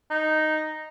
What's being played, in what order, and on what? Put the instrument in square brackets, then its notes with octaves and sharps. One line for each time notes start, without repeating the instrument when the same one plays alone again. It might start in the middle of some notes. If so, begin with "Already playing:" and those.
[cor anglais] D#4